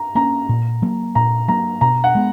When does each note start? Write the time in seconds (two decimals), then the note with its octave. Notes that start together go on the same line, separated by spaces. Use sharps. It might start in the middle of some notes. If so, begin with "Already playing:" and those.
Already playing: A#5
0.15 A#3 C#4 A#5
0.49 A#2
0.82 F#3 A#3
1.15 A#2 A#5
1.48 F#3 A#3 A#5
1.81 B2 A#5
2.04 F#5
2.15 G#3 B3